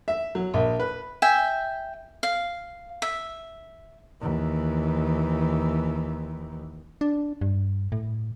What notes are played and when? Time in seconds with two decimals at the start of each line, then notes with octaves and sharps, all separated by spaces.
0.08 E5
0.35 F#3
0.54 A#1
0.80 B4
1.22 E5 G5 G#5
2.23 F5
3.02 E5
4.21 D#2 E3
7.01 D4
7.41 G2
7.92 A2